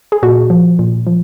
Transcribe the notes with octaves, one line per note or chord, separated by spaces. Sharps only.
G#4
A#2 F#4
F3
A#2
F3